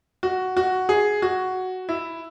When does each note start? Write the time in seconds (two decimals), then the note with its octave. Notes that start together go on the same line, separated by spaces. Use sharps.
0.23 F#4
0.57 F#4
0.89 G#4
1.22 F#4
1.89 E4